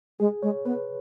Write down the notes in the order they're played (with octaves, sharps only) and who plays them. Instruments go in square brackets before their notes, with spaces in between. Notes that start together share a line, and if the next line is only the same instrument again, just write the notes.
[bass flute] G#3 [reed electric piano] G#4
[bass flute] G#3 [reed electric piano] C#5
[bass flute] B3 [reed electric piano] B4